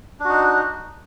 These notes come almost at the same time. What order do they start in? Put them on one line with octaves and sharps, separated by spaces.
D4 F#4 D#4